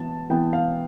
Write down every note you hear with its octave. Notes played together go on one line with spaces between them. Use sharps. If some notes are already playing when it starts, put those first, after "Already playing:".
Already playing: E3 B3 A5
E3 B3 G5
F5